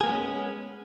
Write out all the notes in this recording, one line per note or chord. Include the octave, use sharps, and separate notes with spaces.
G#3 A#3 B3 C#4 G#4